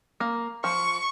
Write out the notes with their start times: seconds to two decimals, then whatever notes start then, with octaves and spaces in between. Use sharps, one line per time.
0.20 A#3
0.64 F3 C#6